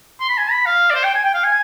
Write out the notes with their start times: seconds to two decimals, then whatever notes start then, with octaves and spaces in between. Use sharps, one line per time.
0.20 C6
0.29 B5
0.37 G#5
0.51 B5
0.66 F5
0.90 D5
0.94 C5
1.04 G5
1.15 G#5
1.24 G5
1.34 F5
1.44 G#5